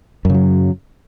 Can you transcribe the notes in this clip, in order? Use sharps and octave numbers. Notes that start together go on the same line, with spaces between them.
F#2 C#3 F#3